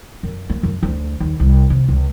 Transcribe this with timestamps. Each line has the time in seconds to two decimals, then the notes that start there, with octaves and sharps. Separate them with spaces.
0.23 F#2
0.50 A#3
0.63 F#2
0.83 D2
1.20 D#2
1.40 C2
1.70 C3
1.88 C#2